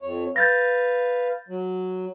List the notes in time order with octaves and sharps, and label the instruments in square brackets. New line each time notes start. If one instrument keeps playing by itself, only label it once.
[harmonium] F2 C#5
[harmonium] B4 F5 [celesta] G6 A6 A#6
[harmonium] F#3